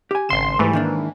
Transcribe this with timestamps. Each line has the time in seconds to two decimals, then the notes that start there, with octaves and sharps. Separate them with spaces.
0.11 G4 G#5
0.29 G#1 C#3 C6 E7
0.59 G#2 E3 G3 A3
0.73 D#3 A#3 D4